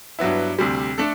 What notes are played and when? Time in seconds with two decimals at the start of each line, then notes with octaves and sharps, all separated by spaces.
0.19 G2 F#3 B3 E4
0.59 D2 C3 G3
0.98 A3 D4 A4